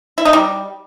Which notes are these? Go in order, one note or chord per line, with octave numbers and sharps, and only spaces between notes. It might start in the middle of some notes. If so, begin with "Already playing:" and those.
E4
D#4
G3